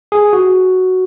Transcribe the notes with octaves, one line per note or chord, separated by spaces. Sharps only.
G#4
F#4